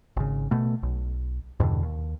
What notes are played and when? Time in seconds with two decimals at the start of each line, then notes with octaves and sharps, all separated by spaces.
0.17 G#1 C#3
0.51 B2 A3
0.83 B1
1.60 E2 G2 B2 D3
1.83 D#2